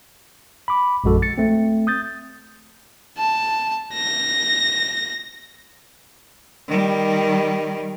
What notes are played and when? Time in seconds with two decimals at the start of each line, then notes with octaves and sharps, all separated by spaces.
0.68 B5 D6
1.04 A#1 F#2 G#3 F#4 A4
1.22 A6 C#7
1.38 A3 C4
1.87 D#6 G6 A6
3.18 A5
3.94 A#6
6.68 D#3 G3